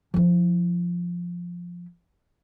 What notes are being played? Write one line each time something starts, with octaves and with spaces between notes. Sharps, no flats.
F3 E4